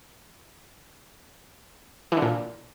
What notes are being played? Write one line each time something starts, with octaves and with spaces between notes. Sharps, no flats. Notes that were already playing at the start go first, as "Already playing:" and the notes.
E3
D3
A#2